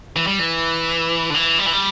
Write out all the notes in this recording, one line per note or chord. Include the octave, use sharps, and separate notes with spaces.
E3
G3
E3
D3
E3
G3
E3
G3